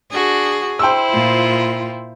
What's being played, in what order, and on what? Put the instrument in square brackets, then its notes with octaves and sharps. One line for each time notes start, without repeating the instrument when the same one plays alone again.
[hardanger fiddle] D4 F#4 [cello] G#4
[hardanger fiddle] E4 C5 [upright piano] G5 C6 E6
[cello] A#2 F4